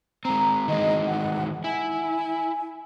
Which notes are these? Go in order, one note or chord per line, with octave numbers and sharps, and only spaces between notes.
G#3 C4 A#5
D#3 E3 G#3 D#5
F#5
E4 G#5